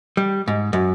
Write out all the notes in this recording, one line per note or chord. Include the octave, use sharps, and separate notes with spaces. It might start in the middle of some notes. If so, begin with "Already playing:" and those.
G3
G#2
F#2